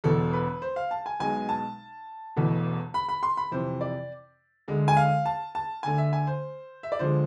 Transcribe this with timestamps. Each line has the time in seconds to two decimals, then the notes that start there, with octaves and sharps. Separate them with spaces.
0.04 E1 E2 B2 A4
0.33 B4
0.62 C5
0.76 F5
0.91 A5
1.06 G#5
1.20 B1 B2 G#3 G#5
1.49 A5
2.36 E1 E2 B2 A3
2.94 B5
3.09 B5
3.23 C6
3.37 B5
3.52 F2 C3 E3 C5
3.81 D5
4.68 D2 D3 G#3
4.88 G#5
4.97 F5
5.26 A5
5.55 A5
5.83 D2 D3 A3 G#5
5.98 E5
6.13 G#5
6.27 C5
6.83 E5
6.92 D5
6.99 D2 D3 F3 G#3 C5